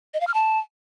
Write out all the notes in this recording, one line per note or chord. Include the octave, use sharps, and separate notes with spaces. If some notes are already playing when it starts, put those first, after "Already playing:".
D#5
F5
F6
A5